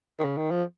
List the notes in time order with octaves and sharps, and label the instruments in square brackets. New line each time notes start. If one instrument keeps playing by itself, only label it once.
[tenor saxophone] D#3
C#3
D#3
F3